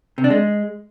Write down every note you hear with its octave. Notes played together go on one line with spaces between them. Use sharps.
C3
D4
G#3